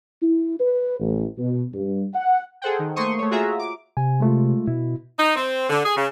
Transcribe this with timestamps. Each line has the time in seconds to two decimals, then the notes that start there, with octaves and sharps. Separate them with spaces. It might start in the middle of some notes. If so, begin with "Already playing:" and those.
0.22 E4
0.59 B4
1.00 A1
1.37 B2
1.74 G2
2.14 F#5
2.62 G#4 A4 C5 F#5 G5
2.79 D#3
2.96 A3 A#3 C5 C6 C#6 D#6
3.18 A3 C#5
3.31 F4 F#4 G#4 E5 A#5
3.59 D6
3.97 C3 G#5
4.20 G#3 A3 F4
4.67 B2 E4
5.18 D#4
5.36 C4
5.70 D3
5.84 G#4
5.97 C#3